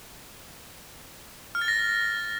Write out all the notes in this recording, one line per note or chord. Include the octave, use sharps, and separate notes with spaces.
F6
A6
A#6